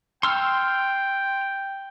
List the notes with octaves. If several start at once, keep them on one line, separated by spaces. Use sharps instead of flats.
G5 C6 E6 F6